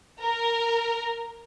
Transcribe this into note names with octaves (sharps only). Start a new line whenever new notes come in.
A#4